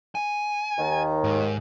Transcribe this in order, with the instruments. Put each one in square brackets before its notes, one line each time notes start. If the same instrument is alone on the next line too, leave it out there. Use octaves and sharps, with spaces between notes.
[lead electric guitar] G#5
[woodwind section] D#2 D#3
[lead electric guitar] G#2